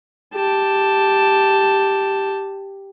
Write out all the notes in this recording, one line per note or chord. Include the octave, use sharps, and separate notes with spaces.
G4 A5